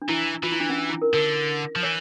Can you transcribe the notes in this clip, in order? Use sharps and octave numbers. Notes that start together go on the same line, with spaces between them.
D4
E3 E4
E3 F4
E4
D4
C#4
D4
E4
A#4
D3 A#4
F3
E3 C#5